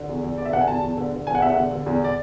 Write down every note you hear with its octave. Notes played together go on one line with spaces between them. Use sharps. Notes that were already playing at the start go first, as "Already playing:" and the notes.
Already playing: D3
E2
E2
D3 D5
E5
D3 F#5
G#5
E2 A5
E2
D3
D3
E2 G#5
F#5
E2 E5
F#5
D3
D3
E2
D5